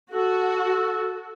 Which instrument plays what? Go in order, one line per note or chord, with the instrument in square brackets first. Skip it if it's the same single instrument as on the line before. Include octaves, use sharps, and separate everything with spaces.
[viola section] F#4 [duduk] A4